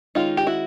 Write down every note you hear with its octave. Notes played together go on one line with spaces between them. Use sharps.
D#3 G#3 C#4 D#4 F4
G4
E4 F#4